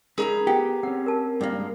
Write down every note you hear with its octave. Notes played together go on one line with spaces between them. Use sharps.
G#3 C#4 D#4 G#4 A#4 A#5 B5
B3 G4 F#5 G5
C4 C#4 F#5
A#4 A5
G2 A#3
G#3